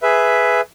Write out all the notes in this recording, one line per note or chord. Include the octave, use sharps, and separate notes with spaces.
G#4 B4 E5